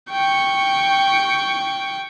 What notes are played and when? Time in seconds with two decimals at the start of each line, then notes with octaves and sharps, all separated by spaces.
0.11 G5 C#6